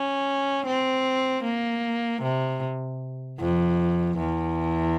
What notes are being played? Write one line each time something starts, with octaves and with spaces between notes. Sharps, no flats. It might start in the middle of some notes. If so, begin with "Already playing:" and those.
Already playing: C#4
C4
A#3
C3
F2
E2